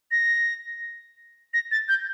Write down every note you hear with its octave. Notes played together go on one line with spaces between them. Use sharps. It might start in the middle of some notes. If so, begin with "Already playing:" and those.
A#6
A#6
A6
G6